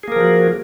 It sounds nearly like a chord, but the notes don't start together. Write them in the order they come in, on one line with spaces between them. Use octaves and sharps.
G#4 A#3 A#4 F3 F#4